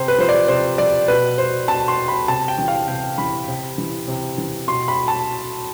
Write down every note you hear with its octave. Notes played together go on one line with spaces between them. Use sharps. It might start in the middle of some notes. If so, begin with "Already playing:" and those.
Already playing: C3 C5
B4
F3 C5
D5
C3 C5
F3 D5
B2 B4
C5
B2 A5
C6
B5
C3 A5
G5
E3
F5
C3 G5
E3 B5
C3
E3
C3
E3
B2 C6
B5
A5